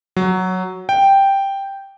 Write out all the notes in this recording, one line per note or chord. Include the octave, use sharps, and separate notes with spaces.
F#3
G5